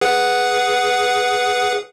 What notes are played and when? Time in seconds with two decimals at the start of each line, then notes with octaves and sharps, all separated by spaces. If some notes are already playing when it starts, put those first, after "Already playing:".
0.01 G#4 B4 F#5